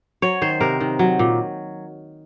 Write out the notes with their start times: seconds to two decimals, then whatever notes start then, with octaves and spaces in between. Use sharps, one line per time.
0.22 F#3 C#5
0.42 D#3 C5
0.61 C3 A#4
0.80 D#3
0.99 F#3
1.19 A#2